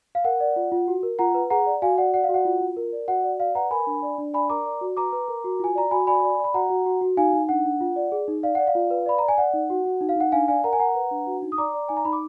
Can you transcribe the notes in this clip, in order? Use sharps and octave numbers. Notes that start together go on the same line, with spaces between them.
F5
A#4 F#5
D5
F4
F4
F#4
A#4
F4 F#5 A#5
B4
G#4 F#5 A#5
D5
F#4 F5 G#5
D5 F#5
D5 F#5
F5
F#4
F#5
F4
F4
A#4
D5
F#4 F#5
D5
D5 F5
B4 F#5 A#5
A#4 G#5 B5
D4
D5
D4
D5 G#5 B5
A#4 A#5 D6
D5
F#4
B4 A#5 D6
B4
A#4
F#4
F4 G#5
D5 A#5
F#4 G#5 B5
D5 G#5 B5
D5
D5
B5
F#4 F#5 A#5
F#4
F#4
F#4
D#4 F5 G#5
D#4
D4 F#5
D4
F4
D5
G#4
D#4
D5 F5
D5 F#5
F5
F4
B4
D5 B5
D5 A#5
G#5
D5 F#5
D#4
F#4
F#4
D#4
F5
D#4 F#5
D4 F5 G#5
D5 F5 G#5
A#4 F#5 A#5
G#5
A#4 F#5 A#5
B4
D4
F#4
D#4
D#6
D5 A#5 D6
D5
D#4 G#5
A#5
D#4 B5
D6